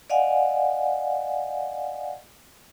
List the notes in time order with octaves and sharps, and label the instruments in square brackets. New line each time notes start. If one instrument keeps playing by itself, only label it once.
[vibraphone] D5 D#5 F5 F#5 G#5